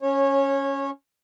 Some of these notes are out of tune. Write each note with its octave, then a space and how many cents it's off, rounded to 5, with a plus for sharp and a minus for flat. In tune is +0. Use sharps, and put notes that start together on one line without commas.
C#4 +0 C#5 -20